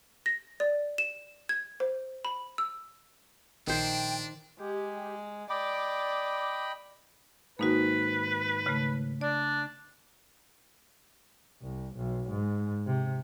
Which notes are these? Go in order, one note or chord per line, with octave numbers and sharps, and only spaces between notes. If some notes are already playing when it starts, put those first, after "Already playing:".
A#6
D5
E7
G#6
C5
B5
E6
A#1 D#3 D4 C5 G5
G#3 G4
D5 D#5 G5 B5 D6
G#2 D#3 A#3 D#4 F#4 B4
C#3 A3
D4 D5
C2
B1
G#2
C3